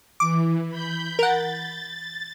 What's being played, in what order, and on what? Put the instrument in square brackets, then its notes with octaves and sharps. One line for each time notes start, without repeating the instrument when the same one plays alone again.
[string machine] E3 [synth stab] D6
[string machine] B5 G6
[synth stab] A#4 F#5 [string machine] A6